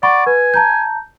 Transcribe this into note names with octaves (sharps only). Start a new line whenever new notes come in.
D5 F#5 B5 C#6
B4 G#5
A5 A#5 G6